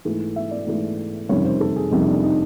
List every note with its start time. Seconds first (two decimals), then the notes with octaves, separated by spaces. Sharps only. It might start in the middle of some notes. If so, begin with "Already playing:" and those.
0.05 G#2 E3 A3
0.36 E5
0.51 D5
0.66 G#2 E3 A3
1.29 F#1 F2 C3 D#3 G3 C#5
1.45 C5
1.60 A4
1.76 G#4
1.91 F#1 F2 C3 D#3 G3 D#4
2.08 D4
2.23 D#4